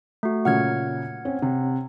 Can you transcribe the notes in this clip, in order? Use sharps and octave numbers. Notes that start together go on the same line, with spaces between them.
A3 F#4
A#2 C#3 F#3 F#5 F6 G#6
C4 C#4
C3